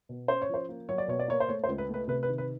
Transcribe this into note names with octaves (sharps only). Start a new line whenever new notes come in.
B2
C#4 C5
C#5
F3 C5
A#3
F#3 C#5
D5
B2 C#5
D5
A#3 C#5
C5
A3 C#5
C5
C#2
B4
A3 B4
C3 B4
B4
D#3
B4